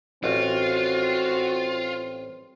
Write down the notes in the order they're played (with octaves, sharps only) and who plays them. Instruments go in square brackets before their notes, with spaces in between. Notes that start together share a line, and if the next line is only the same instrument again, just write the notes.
[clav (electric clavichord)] A1 [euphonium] C4 [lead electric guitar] F4 [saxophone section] F#4